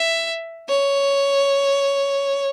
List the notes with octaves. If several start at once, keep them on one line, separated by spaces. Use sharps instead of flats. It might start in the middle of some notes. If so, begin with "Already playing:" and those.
Already playing: E5
C#5